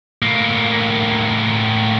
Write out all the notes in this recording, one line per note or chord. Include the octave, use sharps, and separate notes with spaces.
A2 A#3